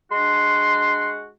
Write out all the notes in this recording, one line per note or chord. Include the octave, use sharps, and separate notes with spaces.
G#3 D4 F#4 C6